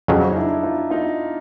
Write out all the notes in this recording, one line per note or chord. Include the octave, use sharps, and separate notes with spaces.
F2 C#3 F#3
D#4
D4 E4
D#4 F4
D#4 F4